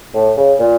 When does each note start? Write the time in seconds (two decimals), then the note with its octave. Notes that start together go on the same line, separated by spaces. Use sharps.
0.14 A2
0.37 C#3
0.60 A#2